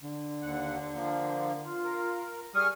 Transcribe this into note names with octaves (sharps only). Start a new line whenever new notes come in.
D3
D#2 F#5
F3 A#3
F4
A#4
G3 G#4 C#6 D#6 F6